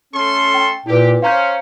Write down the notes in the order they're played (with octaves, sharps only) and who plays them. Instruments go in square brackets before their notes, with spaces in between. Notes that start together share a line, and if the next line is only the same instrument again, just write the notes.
[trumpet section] A3 A4 C6 [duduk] C#4
[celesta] G5
[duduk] A#2 [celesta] E4 B4 [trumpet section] G4
[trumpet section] C#4 [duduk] C5 [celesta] F5 A#5 G6